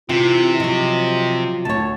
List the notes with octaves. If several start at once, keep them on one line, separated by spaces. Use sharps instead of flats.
C3 E3 F4
F3 F#3 D#5
D2 C#5 A5